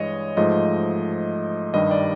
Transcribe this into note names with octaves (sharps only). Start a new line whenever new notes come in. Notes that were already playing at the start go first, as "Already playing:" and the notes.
Already playing: G2 E3 G#3 C#5 D#5
G#2 F3 A3 D#5
G2 D#3 G3 D#5
D5